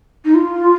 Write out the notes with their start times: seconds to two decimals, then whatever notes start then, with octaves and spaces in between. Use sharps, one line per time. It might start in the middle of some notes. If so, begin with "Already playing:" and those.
0.25 D#4
0.34 F4